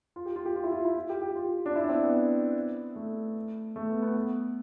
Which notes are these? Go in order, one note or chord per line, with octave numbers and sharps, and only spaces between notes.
F4
G4
F4
G4
F4
E4
F4
E4
F4
G4
G4
F4
D4
E4
D4
C4
B3
A3
A3
B3
B3
B3